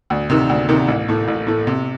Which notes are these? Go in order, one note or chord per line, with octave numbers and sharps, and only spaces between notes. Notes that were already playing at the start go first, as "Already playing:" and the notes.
D2
C3 D#3
D2
C3 D#3
A1
A2 A3
A1
A2 A3
C3